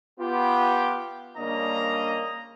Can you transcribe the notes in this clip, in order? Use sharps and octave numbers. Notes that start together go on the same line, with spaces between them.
B3 F4 G4
C#3 G3 A#3 D4 D#5 A#5